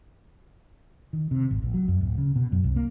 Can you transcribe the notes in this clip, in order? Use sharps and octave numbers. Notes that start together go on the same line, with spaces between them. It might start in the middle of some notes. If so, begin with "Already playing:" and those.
D#3
C3
G#1
A#1
F#3
F#2
D1
C#3
B2
F#2
C2
A#3